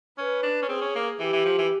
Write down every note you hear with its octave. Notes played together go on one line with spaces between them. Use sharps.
C#4 B4
D4
C#4
C4 G#4
C#4
A#3
E3 G4
E3
F3
E3